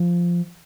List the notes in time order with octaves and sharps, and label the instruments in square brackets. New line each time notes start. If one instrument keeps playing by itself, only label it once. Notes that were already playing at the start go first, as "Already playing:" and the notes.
Already playing: [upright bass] F3